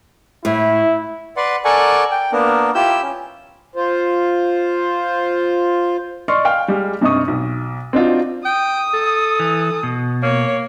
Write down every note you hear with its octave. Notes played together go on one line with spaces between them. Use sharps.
A2 E4
B4 D5 F#5 C6
A4 A#4 D5 F#5 G#5 C#6
G5
A#3 B3 D4 A#4
E4 F4 G4 E6 G6
C#4
F4 C5
D5 D#5 C6 C#6 F6
F5 G5 F6
G3 G#3 G4 G#4
G2 C3 D#4 C#6 D#6
B1
C4 D4 D#4 F4 F#4
G5 D#6
A4
E3
B2
A#3 C#5